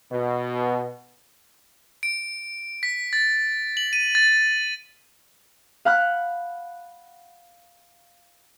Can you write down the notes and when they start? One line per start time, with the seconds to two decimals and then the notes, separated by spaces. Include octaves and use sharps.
0.12 B2
2.03 D7
2.83 B6
3.13 A6
3.77 F#7
3.93 D#7
4.15 A6
5.85 F5 F#5 B5 F#6